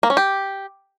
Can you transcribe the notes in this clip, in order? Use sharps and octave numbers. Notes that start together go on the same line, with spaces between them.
A#3
C#4
G4